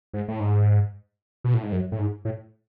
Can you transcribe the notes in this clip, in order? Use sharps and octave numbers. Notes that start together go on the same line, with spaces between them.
G#2
A2
G#2
B2
A2
G#2
F#2
A2
G#2
A2